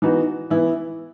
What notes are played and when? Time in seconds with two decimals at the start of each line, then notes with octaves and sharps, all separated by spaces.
0.02 E3 B3 D#4 F#4
0.50 E3 B3 E4